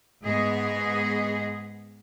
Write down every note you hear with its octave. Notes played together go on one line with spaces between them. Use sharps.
G#2 B3 G#4 D#5